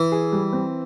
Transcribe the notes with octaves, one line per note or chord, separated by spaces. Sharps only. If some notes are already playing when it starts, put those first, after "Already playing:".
Already playing: E3
G#4
G3
C4